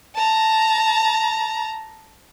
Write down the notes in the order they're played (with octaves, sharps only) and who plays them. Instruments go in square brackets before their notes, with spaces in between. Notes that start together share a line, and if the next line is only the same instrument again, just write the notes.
[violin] A5 A#5